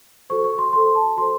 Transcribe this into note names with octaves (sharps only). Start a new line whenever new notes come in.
F#4 A4 C5 C#6
C#6
C6
F#4 A4 C5 C6
A5
F#4 A4 C5 C6